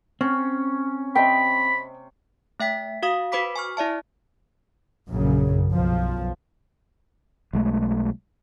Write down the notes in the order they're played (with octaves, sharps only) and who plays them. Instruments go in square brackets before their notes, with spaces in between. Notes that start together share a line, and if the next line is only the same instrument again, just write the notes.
[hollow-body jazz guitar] C4 [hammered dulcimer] C#4
[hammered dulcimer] C3 [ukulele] D#5 E5 G5 [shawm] B5
[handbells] A3 E5 G5 B6
F#4 F5 D#6
F#4 B4 C5 B5 D6 B6
G#5 C#6 F6
E4 D5 E5 A5
[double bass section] A#1 F#2 C#3
B1 F3
[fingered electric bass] B1 G#3 A3